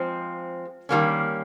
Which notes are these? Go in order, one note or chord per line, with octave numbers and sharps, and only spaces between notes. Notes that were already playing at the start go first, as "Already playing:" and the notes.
Already playing: F3 G#3 C4
D#3 G3 A#3 C#4